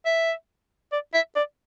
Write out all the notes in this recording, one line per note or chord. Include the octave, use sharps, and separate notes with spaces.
E5
D5
E5
D5